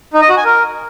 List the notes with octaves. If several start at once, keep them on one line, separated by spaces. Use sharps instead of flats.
D#4
D#5
F#4
G#5
A#4